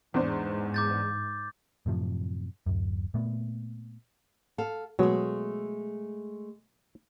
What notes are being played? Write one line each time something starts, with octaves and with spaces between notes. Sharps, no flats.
E2 G#2 D4 C5
D6 G6 A6
F#2 A2 C3 F3
D1 F#2
A#2 A3 B3
A4 F5
B2 F#3 G#3 A3